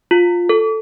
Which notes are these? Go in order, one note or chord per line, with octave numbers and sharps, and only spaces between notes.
F4
A4